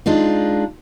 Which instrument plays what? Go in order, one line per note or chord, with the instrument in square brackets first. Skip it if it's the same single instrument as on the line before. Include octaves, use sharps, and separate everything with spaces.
[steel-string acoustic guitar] G#3 D4 D#4 F4